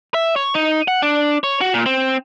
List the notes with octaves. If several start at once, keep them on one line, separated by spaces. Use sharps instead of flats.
E5
C#5
D#4
F#5
D4
C#5
F#4
A#2
C4